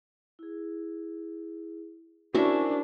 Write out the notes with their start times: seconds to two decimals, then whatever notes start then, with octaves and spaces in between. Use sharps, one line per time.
0.39 E4 G#4
2.35 C#4 D4 E4 F#4 A#4 C5 E5 G#5